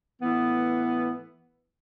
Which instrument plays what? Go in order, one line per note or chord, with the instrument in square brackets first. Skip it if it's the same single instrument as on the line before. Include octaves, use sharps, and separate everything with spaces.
[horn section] A2 E3 B3